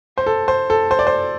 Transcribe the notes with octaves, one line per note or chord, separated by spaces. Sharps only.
C5
A4
C5
A4
C5
D5
C5